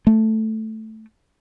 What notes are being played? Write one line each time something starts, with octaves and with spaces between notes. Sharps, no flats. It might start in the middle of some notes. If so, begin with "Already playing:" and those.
A3